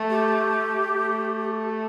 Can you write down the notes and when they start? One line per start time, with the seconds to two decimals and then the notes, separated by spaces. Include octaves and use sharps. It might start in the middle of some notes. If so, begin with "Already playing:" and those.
Already playing: A3
0.10 G4
0.93 A3